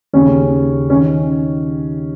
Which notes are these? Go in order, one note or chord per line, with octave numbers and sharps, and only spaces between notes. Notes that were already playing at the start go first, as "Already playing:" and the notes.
D#2 C#3 C#4
C#4
D#3